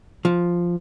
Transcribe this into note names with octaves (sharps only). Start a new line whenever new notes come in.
F3